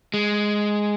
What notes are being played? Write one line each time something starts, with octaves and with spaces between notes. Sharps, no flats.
G#3